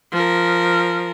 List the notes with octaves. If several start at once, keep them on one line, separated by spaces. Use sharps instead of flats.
F3 A#4